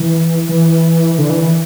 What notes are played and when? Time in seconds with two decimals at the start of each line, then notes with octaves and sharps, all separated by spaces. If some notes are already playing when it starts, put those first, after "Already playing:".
Already playing: E3
0.49 E3
1.18 D3
1.30 E3
1.42 E3